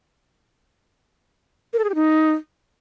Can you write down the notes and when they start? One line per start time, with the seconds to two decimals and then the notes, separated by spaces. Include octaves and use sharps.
1.73 A#4
1.79 A4
1.84 G#4
1.90 G4
1.95 D#4